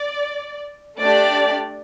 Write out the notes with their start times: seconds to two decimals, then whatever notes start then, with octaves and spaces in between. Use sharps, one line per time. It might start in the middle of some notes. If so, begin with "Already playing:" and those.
Already playing: D5
1.00 A3 D4 G4 D5